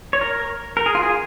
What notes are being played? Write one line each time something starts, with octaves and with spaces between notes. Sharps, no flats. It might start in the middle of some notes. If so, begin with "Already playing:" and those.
C#5
A#4
A#4
G#4
F4
G#4